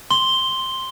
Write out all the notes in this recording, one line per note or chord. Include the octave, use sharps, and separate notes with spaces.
C6 G7